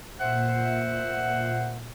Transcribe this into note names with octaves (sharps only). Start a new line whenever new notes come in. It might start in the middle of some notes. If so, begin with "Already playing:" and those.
A#2 C5 E5 F#5